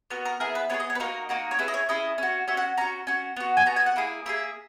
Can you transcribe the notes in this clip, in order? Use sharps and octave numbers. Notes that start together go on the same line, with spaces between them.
B3 F#4 A#4
A#4
B3 E4 G#4 A#4
B4
B3 E4 G#4 C#5
D#5
C#5
B4
A#3 D#4 F#4 A#4
A#3 D#4 F#4
C#5
C#4 E4 G#4 B4
D#5
C#5
C#4 E4 G#4 D#5
C#4 F#4
C#4 F#4 E5
F#5
C#4 F#4 A#5
C#4 F#4
B3 F#4
G#5
B3 F#4 A#5
G#5
F#5
A#3 E4 G#4
A#3 E4 G#4 E5